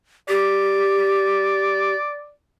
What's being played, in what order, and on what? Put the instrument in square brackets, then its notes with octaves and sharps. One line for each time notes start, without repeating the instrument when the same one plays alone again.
[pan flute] G4 [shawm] D5